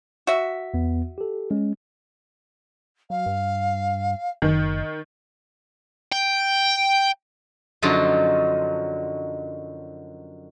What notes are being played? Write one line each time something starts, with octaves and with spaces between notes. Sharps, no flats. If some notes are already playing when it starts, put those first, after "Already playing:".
F#4 E5
E2 B3
G4 A4
G#3 C#4
F#3 F5
G2
F#1 D#3
G5
F#2 D3 F3 F#3 D#4 F4